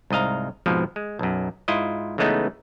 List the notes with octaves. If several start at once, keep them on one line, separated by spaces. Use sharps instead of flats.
C2 G#2 D#5 F5 A#5
F2 G#2 B2 F3
G#3
B1 F#2
G#2 E4 F4 D#5
C#3 E3 G#3 A3 B3 D#4